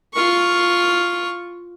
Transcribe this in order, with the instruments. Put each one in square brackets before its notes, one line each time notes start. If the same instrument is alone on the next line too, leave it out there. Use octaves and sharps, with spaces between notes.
[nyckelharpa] F4 C#6